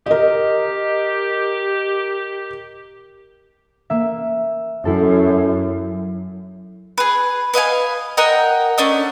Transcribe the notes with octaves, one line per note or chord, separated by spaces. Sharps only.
G4 A#4 D#5
A#3 E5
F#2 E4 A4
G#4 B4
B4 D#5 F5 G#5
A#4 D#5 F#5 G5
A3 C#4 D4 D#5